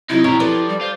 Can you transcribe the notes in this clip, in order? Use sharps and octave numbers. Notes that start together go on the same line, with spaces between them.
C3 F#3 C4 D#4 E4
E1 E4 G4 A#4 C#5
F3 G4 A4 B4 D5
G3
F4 C5